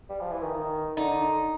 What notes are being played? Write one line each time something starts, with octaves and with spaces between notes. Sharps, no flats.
G3
F3
E3
D#3
D#3
D3 D#4